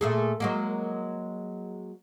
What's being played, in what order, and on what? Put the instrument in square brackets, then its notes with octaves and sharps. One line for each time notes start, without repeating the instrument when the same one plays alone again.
[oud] A#2 A3 G#4
F#3 G#3 A#3